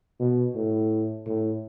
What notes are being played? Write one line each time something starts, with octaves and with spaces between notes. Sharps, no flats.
B2
A2
A2